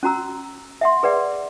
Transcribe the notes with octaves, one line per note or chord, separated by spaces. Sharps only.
C#4 F#4 A#5 E6
E5 F#5 C6
G#4 B4 D5 F#5